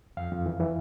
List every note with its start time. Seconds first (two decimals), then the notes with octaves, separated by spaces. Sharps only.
0.17 F2 F5
0.32 F2
0.46 E3
0.60 E3